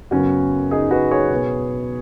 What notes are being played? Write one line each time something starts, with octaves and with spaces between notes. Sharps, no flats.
F#2 C#3 B3 C#4 F#4
D#4 G#4
F#4 B4
G#4 C#5
B2 B3